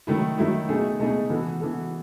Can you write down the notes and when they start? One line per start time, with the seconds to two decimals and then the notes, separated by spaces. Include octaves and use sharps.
0.07 D#3 F#3 A3 E4
0.38 D#3 F#3 A3 E4
0.69 B2 A3 D#4 G#4
0.99 B2 A3 D#4 G#4
1.30 E3 B3 F#4 A4
1.61 E3 B3 F#4 A4